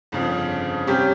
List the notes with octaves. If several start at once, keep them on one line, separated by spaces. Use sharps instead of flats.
G1 F2 C#3 F3 C4
C3 G3 C#4 G4